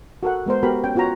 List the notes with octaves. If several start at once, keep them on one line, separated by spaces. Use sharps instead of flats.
F#4 A4 A#4 F#5
G#3 B3 A#4 C5
B3 F#4 G4 A4 A#4 B5
C#4 G5
B3 F4 F#4 C#5 A#5